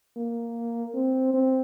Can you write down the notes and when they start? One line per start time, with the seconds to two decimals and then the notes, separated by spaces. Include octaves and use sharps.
0.16 A#3
0.94 C4
1.33 C4